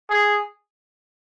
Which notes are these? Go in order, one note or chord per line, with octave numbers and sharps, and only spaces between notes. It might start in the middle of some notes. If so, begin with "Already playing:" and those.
G#4